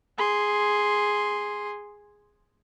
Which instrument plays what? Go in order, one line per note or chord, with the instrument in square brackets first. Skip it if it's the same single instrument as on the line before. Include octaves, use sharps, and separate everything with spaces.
[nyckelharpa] G#4 C6